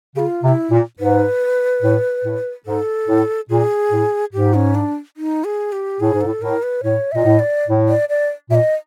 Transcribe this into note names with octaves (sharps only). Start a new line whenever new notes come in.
C#3 G4
F4
C3 F4
E4
A#2
G#2 B4
A2
A2
G#2 A4
A2
A#2 G#4
A2
G#2 G4
C#4
D4
D#4
G#4
G4
A2 G#4
G#2
A2 A4
A2 A#4
B4
A2 C#5
E5
A#2 D#5
A2
D5
A2
D5
D5
A#2 E5
D#5